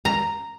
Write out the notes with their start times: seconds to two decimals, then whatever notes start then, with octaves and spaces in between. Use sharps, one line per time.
0.05 A#5